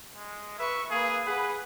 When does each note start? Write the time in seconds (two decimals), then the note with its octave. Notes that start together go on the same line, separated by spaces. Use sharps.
0.16 G#3
0.59 B4 E5 C#6
0.90 A#3 G#4 B4
1.27 G#4 B4 F#5